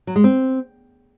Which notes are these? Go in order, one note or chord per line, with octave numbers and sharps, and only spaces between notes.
F#3
G#3
C4